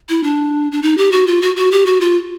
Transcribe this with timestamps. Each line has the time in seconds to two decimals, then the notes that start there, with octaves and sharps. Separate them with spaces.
0.09 E4
0.23 D4
0.72 D4
0.82 D#4
0.97 G4
1.12 F#4
1.27 F4
1.42 F#4
1.56 F#4
1.72 G4
1.86 F#4
2.01 F4